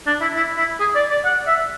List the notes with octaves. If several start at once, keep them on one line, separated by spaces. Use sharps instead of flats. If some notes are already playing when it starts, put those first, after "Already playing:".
D4
E4
E4
E4
G#4
D5
D5
F#5
E5